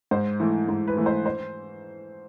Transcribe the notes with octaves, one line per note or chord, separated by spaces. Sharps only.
G#2 C5
E3 A3
G#2
B4
E3 A3
C5
C5